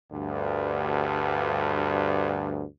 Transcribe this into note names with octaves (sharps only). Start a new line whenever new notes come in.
D2 G2